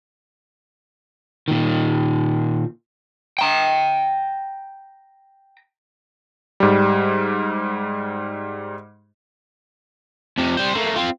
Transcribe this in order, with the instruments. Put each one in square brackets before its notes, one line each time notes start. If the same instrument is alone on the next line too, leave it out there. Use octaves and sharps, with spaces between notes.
[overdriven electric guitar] A#2 D#3
[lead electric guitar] G5 A#5
[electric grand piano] G#2 G3
[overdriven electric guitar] F2 C3
G3 C5
A3 A#3
C4 F4